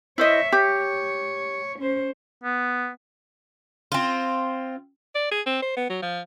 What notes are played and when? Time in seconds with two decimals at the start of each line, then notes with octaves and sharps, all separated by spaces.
0.18 E4 C5 C#5 D#5 E5
0.52 G4 C#5
1.79 C#4 C5
2.44 B3
3.92 C4 F4
5.15 D5
5.31 G#4
5.46 C4
5.62 C5
5.77 B3
5.90 F#3
6.02 F3